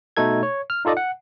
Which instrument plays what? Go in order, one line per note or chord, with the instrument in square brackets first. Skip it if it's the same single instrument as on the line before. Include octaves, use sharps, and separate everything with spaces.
[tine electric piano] B2 A3 D#4 A4 G#6
C#5
F6
D#4 F4 A4 D5 D#5
F#5